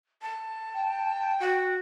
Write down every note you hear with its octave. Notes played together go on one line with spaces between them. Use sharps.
A5
G5
F#4